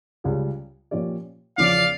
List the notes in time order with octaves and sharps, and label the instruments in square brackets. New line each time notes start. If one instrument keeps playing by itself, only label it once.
[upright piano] C#2 C#3 G3
A#2 F3 C#4 G4 D5
[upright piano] E2 C#3 F3 C#4 [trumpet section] D5 F5